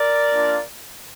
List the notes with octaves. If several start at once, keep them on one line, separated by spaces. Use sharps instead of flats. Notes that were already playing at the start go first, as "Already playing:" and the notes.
Already playing: A#4 D5
A#3 D4 F4